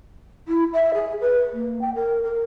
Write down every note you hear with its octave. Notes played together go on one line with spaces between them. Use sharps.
E4
E5
G#4
B4
A#3
G5
A#4
A#4